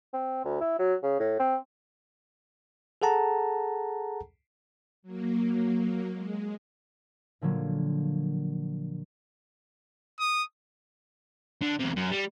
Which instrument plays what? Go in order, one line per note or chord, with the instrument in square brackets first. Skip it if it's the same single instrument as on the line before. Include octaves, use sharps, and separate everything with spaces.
[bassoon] C4
D2
E4
F#3
C#3
A2
C4
[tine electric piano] G#4 A4 F#5 A5 A#5
[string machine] F#3 A#3
G#3
[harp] A#2 D3 F3 F#3 A#3
[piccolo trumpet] D#6
[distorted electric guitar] D3
E2 C3
F#2
G3